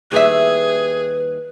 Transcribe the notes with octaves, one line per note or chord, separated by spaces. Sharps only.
D#2 G3 G#4 B4 E5